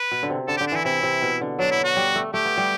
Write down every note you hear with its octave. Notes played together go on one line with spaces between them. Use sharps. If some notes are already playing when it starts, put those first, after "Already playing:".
Already playing: B4
B2
D3
C3
D3 A4
G4
D3
D4
E3 E4
C3 E4
C3
B2
D3
F#3 D4
E4
F#4
G3
A3
A3 G4
B3
G3